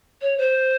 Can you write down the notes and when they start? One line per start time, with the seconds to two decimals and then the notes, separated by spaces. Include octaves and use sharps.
0.21 C#5
0.38 C5